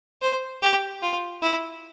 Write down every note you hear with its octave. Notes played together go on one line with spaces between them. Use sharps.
C5
G4
F4
E4